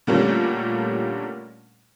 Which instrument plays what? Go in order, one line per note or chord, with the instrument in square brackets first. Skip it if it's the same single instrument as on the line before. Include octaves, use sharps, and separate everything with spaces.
[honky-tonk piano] A#2 D3 G3 A3 A#3 C#4